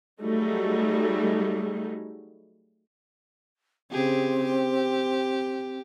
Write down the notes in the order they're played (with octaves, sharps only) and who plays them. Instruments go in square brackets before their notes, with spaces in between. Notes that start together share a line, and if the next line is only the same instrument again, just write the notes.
[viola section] F#3 G3 A3 D#4 F#4 G#4
[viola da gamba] C#3 G4 G#4 [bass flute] C4
[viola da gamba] G4